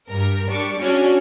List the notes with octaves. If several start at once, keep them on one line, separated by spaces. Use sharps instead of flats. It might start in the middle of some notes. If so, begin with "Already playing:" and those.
G2 G3 A#4
G3 D4 C#6 D6
C#4 D4 F#4 G#4 C#5